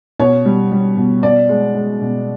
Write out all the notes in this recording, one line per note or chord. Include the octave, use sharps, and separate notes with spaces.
B2 C#5
G3
G3
B2
B2 D5
G#3
G#3
B2